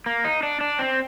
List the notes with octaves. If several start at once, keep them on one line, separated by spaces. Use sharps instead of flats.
A#3
D#4
D4
D4
C4